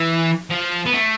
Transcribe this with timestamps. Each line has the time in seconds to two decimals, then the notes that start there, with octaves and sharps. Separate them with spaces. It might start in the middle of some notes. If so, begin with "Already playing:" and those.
Already playing: E3
0.50 F3
0.86 B3
0.93 A3